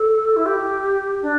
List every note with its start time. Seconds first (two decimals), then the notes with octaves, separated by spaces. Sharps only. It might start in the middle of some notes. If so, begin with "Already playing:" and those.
Already playing: A4
0.36 E4
0.45 G4
1.22 D4